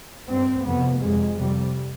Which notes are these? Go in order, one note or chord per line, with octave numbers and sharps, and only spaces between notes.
G2 C4
F2 C3 B3
F2 C3 G#3
F2 C3 G3